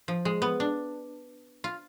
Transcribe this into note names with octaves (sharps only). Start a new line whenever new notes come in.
F3
G#3
B3
D4
F4